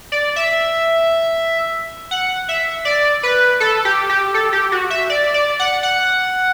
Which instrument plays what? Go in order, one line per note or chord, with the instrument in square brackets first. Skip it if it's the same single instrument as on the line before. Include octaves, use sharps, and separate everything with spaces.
[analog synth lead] D5
E5
F#5
E5
D5
B4
A4
G4
G4
A4
G4
F#4
E5
D5
D5
F#5
F#5